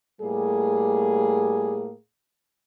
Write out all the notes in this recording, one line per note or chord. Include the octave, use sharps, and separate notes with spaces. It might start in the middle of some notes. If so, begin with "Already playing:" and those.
A2 G3 A#3 G4 G#4